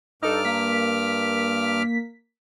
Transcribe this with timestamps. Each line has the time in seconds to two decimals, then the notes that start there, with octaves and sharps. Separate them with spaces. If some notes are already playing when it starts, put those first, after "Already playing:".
0.23 G2 D#4 A4 D6 F6
0.45 A#3 B6